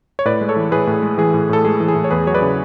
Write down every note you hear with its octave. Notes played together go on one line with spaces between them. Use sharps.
C#5
A2 B4 D5
G#3
A4 C#5
E3
A2 G#4 B4
A2
G#3
E3 G#4
A2
A2 A4
G#3 G#4
E3
G#4
A2
C#5
E2 G#4 B4
F#3 C#5
B4 D5
C#3